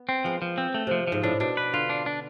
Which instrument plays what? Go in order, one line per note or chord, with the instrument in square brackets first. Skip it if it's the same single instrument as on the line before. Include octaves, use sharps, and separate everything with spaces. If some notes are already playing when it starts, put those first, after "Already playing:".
Already playing: [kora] B3
[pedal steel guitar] C4
[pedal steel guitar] F3 [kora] G#3 B3
[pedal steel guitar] F3
C4
A3
[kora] C3 [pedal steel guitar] F3
[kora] G#2 [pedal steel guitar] F3
[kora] A2 [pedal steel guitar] D4
[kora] B2 [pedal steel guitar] D4
[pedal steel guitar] B4
[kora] D3 [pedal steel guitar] F4
[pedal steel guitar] D4
D4